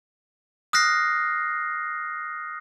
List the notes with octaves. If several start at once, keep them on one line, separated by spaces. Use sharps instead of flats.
D#6 F6 F#6 A#6 C7